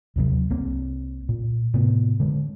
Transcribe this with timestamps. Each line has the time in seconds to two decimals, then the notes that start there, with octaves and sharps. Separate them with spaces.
0.16 D#2 C3 F#3
0.50 C2 A#3 C4
1.29 A#2
1.74 A2 C3 B3
2.20 D3 G#3